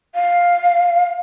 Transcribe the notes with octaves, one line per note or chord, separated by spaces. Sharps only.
F5